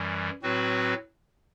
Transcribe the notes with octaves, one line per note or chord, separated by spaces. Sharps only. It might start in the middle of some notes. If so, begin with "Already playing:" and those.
Already playing: F#2 E3 G3
A2 F#3 C4 F#4 B4